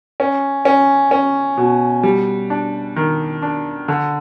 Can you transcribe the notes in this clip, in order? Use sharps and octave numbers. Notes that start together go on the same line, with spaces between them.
C#4
C#4
C#4
B2
G3
D4
D#3
D4
D3